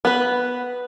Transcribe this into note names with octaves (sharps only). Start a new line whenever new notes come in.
B3 B4